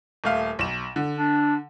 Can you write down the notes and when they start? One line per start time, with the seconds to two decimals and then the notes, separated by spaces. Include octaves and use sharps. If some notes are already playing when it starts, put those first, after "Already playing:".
0.24 D#1 A3 F5
0.59 B1 E7
0.96 D3
1.15 D4